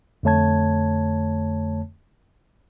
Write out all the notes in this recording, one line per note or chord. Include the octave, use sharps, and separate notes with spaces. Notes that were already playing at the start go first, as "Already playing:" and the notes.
F2 D3 A3 C#5 A5 G#6